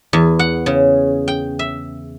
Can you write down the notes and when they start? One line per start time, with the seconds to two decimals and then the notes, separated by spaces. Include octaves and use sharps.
0.13 E2
0.39 F#5
0.66 C#3
1.28 G5
1.59 E5